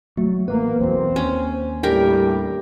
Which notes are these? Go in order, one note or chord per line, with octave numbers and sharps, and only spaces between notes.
F#3 A3
A1 A#3 B3 B4
B1 E2 B2 C4 C5
D#2 C#4 G#5
A2 G3 D4 G4 A#4